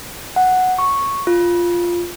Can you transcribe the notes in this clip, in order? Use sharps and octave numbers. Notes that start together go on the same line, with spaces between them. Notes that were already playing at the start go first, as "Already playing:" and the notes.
F#5
C#6
F4